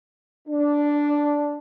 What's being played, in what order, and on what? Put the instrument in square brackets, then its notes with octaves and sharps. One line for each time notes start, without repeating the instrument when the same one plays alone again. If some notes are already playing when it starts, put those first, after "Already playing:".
[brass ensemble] D4